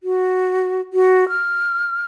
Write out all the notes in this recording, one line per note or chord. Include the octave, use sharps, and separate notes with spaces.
F#4
F#4
F6